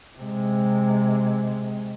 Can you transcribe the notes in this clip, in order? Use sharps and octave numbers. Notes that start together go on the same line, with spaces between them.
C3 G#3